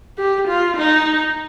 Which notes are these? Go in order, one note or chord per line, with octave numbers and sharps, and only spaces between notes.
G4
F4
D#4